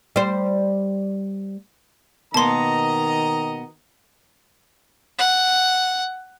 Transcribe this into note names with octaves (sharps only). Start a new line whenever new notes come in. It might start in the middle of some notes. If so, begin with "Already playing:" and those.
G3 C5
B2 D#3 A#3 B3 D#5 A5 A#5 C6
F#5